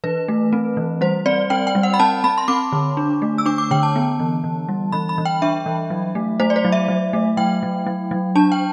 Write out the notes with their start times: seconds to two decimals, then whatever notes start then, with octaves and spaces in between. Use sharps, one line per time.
0.04 E3 B4
0.28 A3
0.53 C4
0.77 E3
1.01 G3 C5
1.26 C4 D5
1.50 C4 G5
1.67 G5
1.75 G3
1.83 F#5
1.94 B5
2.00 C4 A5
2.24 C4 B5
2.38 C6
2.48 C4 D6
2.72 D3
2.97 D4
3.22 A3
3.38 E6
3.46 D4 D6
3.58 D6
3.71 D3 G5
3.83 A5
3.96 B3
4.20 E3
4.44 E3
4.69 G3
4.92 E3 B5
5.09 B5
5.18 E3
5.25 G5
5.42 D4 E5
5.66 E3
5.90 F#3
6.15 A3
6.40 A3 C5
6.50 D5
6.56 C5
6.65 F#3
6.72 E5
6.88 F#3
7.13 A3
7.37 F#3 G5
7.63 F#3
7.86 F#3
8.11 F#3
8.35 D4 A5
8.52 G5